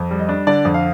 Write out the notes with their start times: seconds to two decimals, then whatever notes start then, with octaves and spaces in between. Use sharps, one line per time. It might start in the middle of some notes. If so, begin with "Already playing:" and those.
Already playing: F2
0.11 G3
0.19 D#5
0.29 D4
0.47 D3 D5
0.65 F2
0.74 F5